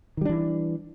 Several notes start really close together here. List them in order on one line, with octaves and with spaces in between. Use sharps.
D#3 G3 D4 E3